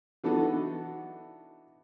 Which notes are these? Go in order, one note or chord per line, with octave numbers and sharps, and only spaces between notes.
E3 B3 D4 D#4 F#4 A4